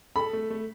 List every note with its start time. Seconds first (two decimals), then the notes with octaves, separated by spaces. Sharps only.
0.16 A4 B5
0.33 A3
0.50 A3